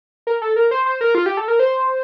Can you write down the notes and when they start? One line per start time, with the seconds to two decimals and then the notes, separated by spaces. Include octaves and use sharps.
0.27 A#4
0.42 A4
0.56 A#4
0.71 C5
0.86 C5
1.01 A#4
1.15 F4
1.26 G4
1.37 A4
1.48 A#4
1.59 C5